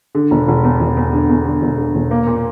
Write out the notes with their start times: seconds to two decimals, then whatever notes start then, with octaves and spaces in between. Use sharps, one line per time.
0.15 D3
0.31 E1
0.48 E1
0.64 E2
0.80 E1
0.97 E2
1.13 D3
1.29 E2
1.45 D3
1.62 E1
1.77 D3
1.95 E1
2.11 A#3
2.27 A#2